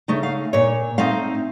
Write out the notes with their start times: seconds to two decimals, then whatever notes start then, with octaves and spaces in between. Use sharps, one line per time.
0.08 C#3 A3 D#4
0.23 F5
0.53 A#2 C#5
0.98 A3 C4 D#4 F5